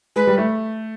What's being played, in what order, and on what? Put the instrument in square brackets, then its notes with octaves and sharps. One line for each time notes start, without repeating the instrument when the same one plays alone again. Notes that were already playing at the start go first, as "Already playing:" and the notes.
[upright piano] G#3 [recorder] B4
[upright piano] G3
A3